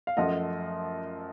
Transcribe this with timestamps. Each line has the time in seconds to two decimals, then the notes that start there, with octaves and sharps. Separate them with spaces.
0.07 F5
0.17 F#2 F3 A3 D#5 F#5